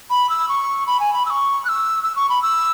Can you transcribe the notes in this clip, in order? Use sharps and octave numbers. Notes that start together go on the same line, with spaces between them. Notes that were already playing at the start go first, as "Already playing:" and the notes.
B5
E6
C#6
B5
G#5
B5
E6
C#6
F#6
E6
E6
C#6
B5
E6